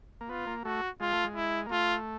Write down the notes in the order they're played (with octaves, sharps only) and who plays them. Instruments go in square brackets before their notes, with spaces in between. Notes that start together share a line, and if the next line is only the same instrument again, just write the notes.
[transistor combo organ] A#3
[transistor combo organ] B3 [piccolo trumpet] F4
[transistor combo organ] A#3
[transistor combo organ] A3 [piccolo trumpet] F#4
[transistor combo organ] G#3 [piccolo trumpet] F4
[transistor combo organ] A3
G#3
[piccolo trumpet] E4
[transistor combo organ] A#3
[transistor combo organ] A3 [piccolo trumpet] F4